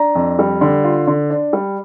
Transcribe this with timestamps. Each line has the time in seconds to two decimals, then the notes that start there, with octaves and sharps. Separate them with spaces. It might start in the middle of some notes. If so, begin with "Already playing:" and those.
Already playing: D4 A#5
0.15 F2
0.39 G3
0.61 D3
0.84 F4
1.07 D3
1.30 D4
1.53 G3